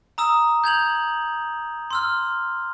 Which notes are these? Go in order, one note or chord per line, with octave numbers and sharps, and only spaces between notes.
A#5 D#6 E6 E7
G6 G#6 F7 F#7
C6 E6 F6